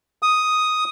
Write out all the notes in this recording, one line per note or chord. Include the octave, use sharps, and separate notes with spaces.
D#6